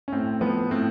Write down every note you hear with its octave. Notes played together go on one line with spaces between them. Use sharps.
C#4
A2 C4
F3 B3
A2 C4